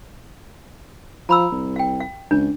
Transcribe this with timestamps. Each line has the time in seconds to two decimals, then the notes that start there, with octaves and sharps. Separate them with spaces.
1.29 F3 A#5 B5 E6
1.52 C2
1.76 F5 G5
2.01 F5
2.31 C#2 D4